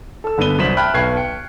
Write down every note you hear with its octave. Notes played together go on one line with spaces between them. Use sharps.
A4 E6
G1 D3 B3 B4 D#7 G7
C2 F#3 C5 B6 E7 F#7
E5 G5 A5 B5 F6 F#6
B1 B4 G5 C#6 G#6 C7
G5 C#7